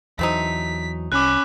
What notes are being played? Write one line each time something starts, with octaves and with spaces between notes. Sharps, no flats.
E2 E3 F#3 A3 C4 D#4 B6
C2 C#4 B5 D6 F#6